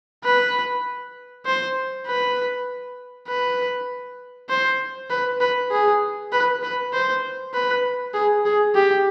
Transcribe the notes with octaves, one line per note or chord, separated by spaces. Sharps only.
B4
C5
B4
B4
C5
B4
B4
G#4
B4
B4
C5
B4
G#4
G#4
G4